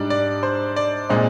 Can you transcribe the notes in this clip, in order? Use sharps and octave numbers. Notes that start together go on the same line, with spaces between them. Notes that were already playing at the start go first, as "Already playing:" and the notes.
Already playing: G#2 G3 D4 D5
D5
C5
D5
A#2 G#3 C4 D#4